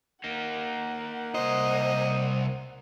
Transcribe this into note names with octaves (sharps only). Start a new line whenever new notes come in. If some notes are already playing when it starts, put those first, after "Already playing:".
A#3 D#4 A#4 F#5
C2 C5 D#5